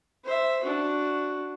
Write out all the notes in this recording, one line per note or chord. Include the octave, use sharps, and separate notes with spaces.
C5 E5
D4 F#4